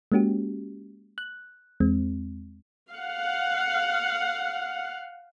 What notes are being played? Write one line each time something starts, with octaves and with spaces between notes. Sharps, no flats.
G#3 A#3 C#4 F#4 G4
F#6
E2 G#3 C4
F5 F#5